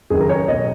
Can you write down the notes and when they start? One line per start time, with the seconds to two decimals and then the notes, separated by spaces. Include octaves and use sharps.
0.10 F#1 F#2 D#3 G#4
0.20 A#4
0.29 C#5
0.48 B1 B2 D#5